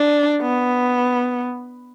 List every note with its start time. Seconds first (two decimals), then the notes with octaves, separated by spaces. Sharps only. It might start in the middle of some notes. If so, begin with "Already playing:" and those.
Already playing: D4
0.42 B3